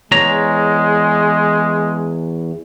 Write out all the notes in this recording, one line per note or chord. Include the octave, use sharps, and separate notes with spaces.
E2 G#3 C#5 A#5